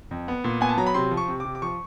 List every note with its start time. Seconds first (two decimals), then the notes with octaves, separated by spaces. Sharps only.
0.11 F2
0.28 B3
0.44 A#2
0.61 B3 G#5
0.69 A5
0.77 F#3 A#5
0.86 B5
0.94 C3 C6
1.11 F3
1.17 C#6
1.28 C3
1.40 C3 D6
1.55 D6
1.62 F3 C#6